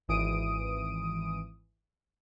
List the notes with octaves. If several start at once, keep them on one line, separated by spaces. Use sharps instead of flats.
G#1 E3 D#6 D7 D#7